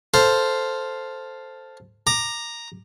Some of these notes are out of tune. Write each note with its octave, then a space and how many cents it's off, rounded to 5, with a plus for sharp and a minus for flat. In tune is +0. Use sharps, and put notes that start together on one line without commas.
A4 +0 C5 +0 F5 +0
A#5 +0 D6 +20